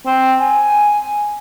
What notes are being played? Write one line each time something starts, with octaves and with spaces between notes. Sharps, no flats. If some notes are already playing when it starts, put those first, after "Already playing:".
C4
G#5